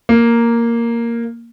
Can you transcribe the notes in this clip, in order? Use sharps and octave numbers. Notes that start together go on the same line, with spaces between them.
A#3